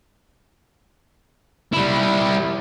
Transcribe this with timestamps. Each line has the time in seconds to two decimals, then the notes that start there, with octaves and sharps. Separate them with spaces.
1.73 G3 E4